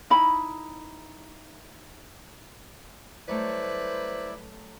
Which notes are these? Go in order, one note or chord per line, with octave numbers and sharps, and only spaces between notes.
D#4 E4 B5
F#3 G3 A3 E4 B4 C5 D5